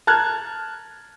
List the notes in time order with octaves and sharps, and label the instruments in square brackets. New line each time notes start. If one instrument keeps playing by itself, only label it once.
[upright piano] A5 A#5 F6 F#6 G#6